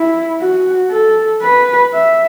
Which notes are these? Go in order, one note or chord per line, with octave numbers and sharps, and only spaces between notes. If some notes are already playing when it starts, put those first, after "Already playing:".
Already playing: E4
F#4
A4
B4
E5